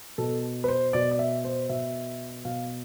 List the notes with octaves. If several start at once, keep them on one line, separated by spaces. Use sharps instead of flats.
B2 A4
B4
C5
B2 D5
D5
E5
C5
B2 E5
B2 F5